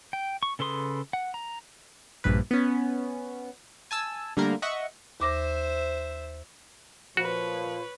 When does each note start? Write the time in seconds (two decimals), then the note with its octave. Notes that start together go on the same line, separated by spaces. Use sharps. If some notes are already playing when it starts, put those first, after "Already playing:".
0.13 G5
0.43 C#6
0.59 C#3 A4 B4 C6 D#6
1.13 F#5
1.34 A#5
2.24 A#1 G2 B4
2.51 B3 C#4
3.91 G#5 A5 E6
4.37 D3 G3 A3 A#3 A#4
4.62 D#5 E5 F#5 C#6
5.20 D#2 C5 E5 D6 A#6
7.17 A#2 F3 F#4 B4 C#5